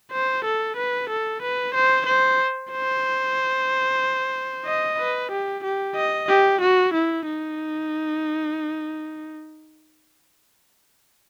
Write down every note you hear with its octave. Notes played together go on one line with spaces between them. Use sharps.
C5
A4
B4
A4
B4
C5
C5
C5
D#5
B4
G4
G4
D#5
G4
F#4
E4
D#4